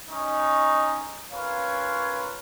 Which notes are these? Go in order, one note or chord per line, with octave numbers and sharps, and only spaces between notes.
C#4 D#4 C#6
C#4 F4 A#4 B4 C#5 F5